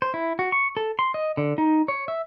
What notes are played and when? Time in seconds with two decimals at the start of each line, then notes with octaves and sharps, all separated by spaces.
0.02 C5
0.14 E4
0.39 F#4
0.52 C#6
0.77 A4
0.99 C6
1.14 D#5
1.37 D3
1.58 D#4
1.88 C#5
2.08 E5